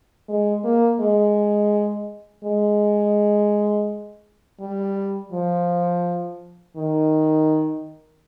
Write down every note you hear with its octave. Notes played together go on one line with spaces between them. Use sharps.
G#3
A#3
G#3
G#3
G3
F3
D#3